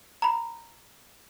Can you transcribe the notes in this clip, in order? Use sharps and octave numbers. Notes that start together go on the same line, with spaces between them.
A#5 B5